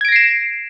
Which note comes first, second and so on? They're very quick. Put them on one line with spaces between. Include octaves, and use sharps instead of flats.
G#6 D7 A#6 C7 E7